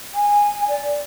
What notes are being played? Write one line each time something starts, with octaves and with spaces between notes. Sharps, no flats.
G#5
D5